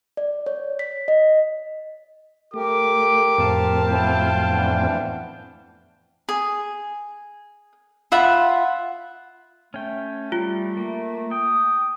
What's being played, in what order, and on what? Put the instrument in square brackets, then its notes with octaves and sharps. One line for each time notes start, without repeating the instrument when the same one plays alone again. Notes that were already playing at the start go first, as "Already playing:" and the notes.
[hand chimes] D5
C#5
B6
D#5
[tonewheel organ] A3 [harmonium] G4 A#4 [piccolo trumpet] D6
[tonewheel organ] F2 A2 C4 [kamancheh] F5 A5
[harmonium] F#3 E4 [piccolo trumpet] G5
[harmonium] E3 B3 D4
[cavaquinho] G#4
F4 E5 F#5 B5
[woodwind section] A3 [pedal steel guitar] C#4 G5
[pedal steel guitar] G3 [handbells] F4
[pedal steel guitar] A#3
[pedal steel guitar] G5 [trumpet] D#6